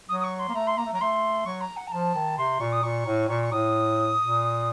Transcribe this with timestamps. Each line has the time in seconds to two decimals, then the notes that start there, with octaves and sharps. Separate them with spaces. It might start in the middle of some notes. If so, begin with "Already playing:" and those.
0.09 F#3 D#6
0.20 D#6
0.24 C#6
0.39 C6
0.49 A#3
0.54 A3 A#5
0.67 C6
0.78 A#3 A#5
0.86 A3
0.93 F#3 A#5
1.01 A3 C6
1.46 F#3 C#6
1.61 A#5
1.77 F#5
1.88 A#5
1.92 F3 A5
2.15 D#3
2.38 C3 C6
2.60 A#2 C#6
2.72 D#6
2.83 A#2 C#6
3.07 A2
3.29 A#2 C#6
3.43 C#6
3.52 A2 D#6
4.21 A#2